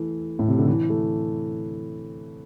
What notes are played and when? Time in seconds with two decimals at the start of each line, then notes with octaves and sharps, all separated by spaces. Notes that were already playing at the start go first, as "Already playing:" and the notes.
Already playing: E3 A3
0.39 A2
0.48 C3
0.58 D3
0.68 E3
0.90 A3